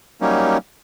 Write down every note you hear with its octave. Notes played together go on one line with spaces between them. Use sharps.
F#3 G3 A#3 C#4 D#4